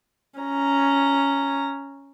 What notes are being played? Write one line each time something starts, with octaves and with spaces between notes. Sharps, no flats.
C#4 A#5